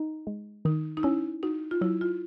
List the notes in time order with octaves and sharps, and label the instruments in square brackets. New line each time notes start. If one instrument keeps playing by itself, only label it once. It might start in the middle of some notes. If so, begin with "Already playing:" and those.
Already playing: [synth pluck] D#4
G#3
[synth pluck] D#3 [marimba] D#4
[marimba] D#4
[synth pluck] C#4 [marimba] E4
[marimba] D#4 [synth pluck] F#4
[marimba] F4
[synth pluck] F#3 [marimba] E4
[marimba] F4